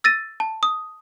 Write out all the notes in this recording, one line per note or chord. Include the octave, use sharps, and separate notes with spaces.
E6 A6 A#6 D#7
A5
D#6